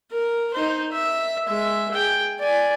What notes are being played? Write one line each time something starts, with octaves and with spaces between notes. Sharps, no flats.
A#4
D#4 C5
E5
G#3 E5
G#4 G5
D5 G#5